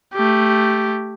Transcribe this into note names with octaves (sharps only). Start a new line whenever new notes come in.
A3 G4